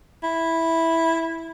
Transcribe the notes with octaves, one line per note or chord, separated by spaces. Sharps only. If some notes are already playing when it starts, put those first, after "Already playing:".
E4